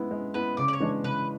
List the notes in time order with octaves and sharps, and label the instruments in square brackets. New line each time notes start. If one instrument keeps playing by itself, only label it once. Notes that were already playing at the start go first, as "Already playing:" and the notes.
Already playing: [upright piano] G#3 B3 E4
G#3
[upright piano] B3 E4 [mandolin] B4
[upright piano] C#3 [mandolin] D5
[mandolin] D5
C#5
[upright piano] E3 G#3 D4
[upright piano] C#3 [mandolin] B4